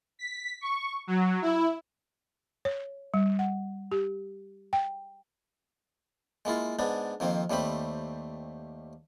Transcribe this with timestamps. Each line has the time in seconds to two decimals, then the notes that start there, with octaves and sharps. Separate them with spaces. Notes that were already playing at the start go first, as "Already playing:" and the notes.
0.19 B6
0.61 C#6
1.07 F#3
1.42 E4
2.65 C#5
3.14 G3
3.39 F#5
3.91 G4
4.73 G5
6.45 G#3 A#3 E4 F4
6.79 G#2 B3 D4
7.20 F2 D#3 A#3 C4
7.50 D#2 G3 A3 C4 B5